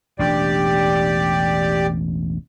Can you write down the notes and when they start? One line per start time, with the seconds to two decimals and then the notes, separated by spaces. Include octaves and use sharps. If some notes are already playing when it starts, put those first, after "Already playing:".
0.19 E1 A1 D4 G4 D5